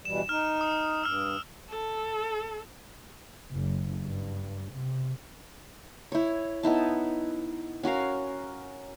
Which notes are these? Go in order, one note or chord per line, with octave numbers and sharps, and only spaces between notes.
B2 E3 G3 E7
D#4 F6
D#6
G2 E6 F6
A4
F#1
G2
C3
E4 C#5
B3 D#4 E4 A5
C#4 F#4 A#4 F5